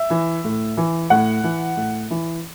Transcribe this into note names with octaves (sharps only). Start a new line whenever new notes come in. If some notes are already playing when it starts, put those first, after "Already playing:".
Already playing: E5
E3
A2
E3
A2 F#5
E3
A2
E3